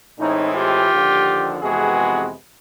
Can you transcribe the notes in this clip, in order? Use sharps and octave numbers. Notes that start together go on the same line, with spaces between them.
A2 E3 G#3 C4 C#4 D#4
F4 G4
D#2 D3 F3
F2 C3 E3 G#3 B3 F#4 G#4